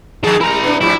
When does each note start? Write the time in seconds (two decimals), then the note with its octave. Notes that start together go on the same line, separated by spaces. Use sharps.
0.24 D#3 F3 G#4 A5
0.41 G3 E4 A#4 A#5
0.63 B3 D4
0.81 G#2 F3 G3 E4